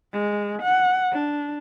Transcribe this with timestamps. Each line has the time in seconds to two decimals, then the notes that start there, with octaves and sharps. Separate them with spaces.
0.13 G#3
0.62 F#5
1.13 D4